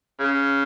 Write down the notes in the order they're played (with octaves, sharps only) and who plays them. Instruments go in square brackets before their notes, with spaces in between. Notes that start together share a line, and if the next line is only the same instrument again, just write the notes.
[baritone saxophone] C#3